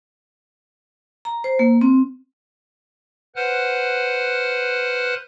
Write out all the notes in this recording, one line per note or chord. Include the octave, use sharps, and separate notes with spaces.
A#5
C5
A#3
C4
B4 C5 F#5 F6 F#6